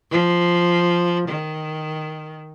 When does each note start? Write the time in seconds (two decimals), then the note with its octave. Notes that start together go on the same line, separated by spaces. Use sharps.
0.11 F3
1.28 D#3